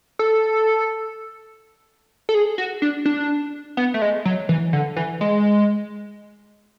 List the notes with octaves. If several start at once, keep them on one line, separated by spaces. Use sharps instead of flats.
A4
A4
G#4
F#4
D4
D4
B3
A3
G#3
F#3
E3
D3
E3
G#3